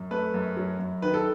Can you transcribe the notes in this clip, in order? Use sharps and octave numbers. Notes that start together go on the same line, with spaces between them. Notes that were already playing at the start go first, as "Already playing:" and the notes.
Already playing: F#2
A3 B4
F#2
F#3
F#2
D#3 B4
A4